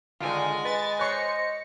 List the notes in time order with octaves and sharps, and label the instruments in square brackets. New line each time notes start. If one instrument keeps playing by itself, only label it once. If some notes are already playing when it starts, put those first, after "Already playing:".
[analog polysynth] D3 D#3 [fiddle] G#3 G#5 [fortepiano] F4
[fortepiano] B4 [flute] D#5 [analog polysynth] A6
[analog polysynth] C5 C#7 [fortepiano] C#5 F#6